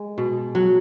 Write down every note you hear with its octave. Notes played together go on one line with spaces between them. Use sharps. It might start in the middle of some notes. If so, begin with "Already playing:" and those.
Already playing: G#3
B2
F#3